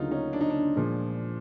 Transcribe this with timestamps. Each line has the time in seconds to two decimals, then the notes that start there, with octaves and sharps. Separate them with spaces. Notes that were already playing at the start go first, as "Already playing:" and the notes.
Already playing: D2 C#3 F#3 A#3 D#4 F4
0.11 C#4 D#4
0.33 D4
0.41 D#4
0.50 D4
0.76 A#2 F3 G#3